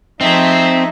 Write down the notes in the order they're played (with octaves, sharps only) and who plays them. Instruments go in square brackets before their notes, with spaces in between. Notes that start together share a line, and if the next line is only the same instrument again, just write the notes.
[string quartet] F3 A3 G#4 [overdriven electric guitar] C4 [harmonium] D#4 D#5 E5